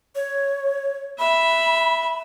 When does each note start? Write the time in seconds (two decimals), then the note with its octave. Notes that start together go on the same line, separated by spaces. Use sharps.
0.15 C#5
1.19 E5 B5